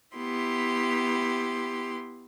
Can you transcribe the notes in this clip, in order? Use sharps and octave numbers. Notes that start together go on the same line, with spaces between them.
B3 E4 G4 C6